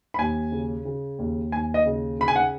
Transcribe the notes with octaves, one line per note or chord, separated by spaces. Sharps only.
B5
D#2 G#5
C#3
C#3
D#2
D#2 G#5
D#5
C#3
C#3 B5
G#5
F#5